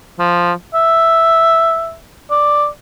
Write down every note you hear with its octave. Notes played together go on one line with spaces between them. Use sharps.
F3
E5
D5